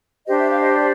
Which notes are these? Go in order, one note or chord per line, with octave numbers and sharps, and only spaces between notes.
D4 G4 C5 D#5
E5
F5
D#5
D5